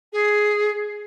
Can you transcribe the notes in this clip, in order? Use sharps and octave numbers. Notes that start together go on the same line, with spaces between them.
G#4